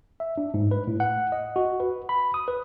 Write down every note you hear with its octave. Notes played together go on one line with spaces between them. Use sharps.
E5
D4
G#2
B4
A2
F#5
D#5
F#4
B4
B5
D#6
B4